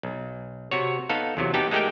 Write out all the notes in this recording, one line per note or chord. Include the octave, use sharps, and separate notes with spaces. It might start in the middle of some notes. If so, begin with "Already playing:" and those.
B1
C3 F#4 C#5
B3 D#4 A4 F5
E2 C3 F#3
B3 D#4 G4 G5 A5
G#3 A3 D#4 G4 A#4 G5